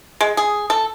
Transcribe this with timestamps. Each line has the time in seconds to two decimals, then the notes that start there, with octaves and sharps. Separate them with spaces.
0.21 G#3
0.37 G#4
0.70 A4